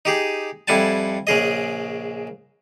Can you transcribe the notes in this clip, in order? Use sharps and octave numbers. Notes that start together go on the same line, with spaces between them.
D#4 G4 G#4
F2 G3 E4 F#5 G#5 A5
A#1 C#3 G#4 D#5